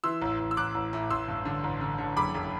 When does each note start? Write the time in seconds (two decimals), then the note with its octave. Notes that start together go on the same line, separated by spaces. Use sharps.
0.04 E3 C6 E6
0.22 A1
0.40 A1
0.51 E6
0.57 A1 D6 F#6
0.75 A1
0.93 A2
1.10 A1 C6 E6
1.28 G2
1.45 D3
1.64 A1
1.81 D3
1.98 D3
2.17 F#1 B5 D6
2.35 F#1